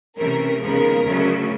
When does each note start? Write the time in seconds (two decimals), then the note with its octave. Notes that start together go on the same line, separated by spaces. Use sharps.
0.17 C3 E3 A3 C#4 A#4
0.61 D#2 C#3 F3 G#3 B3 A#4
1.06 D2 C#3 F#3 A3 C#4